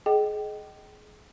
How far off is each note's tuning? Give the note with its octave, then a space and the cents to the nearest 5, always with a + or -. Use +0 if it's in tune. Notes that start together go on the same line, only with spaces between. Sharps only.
G#4 +30 D#5 -5 G5 -30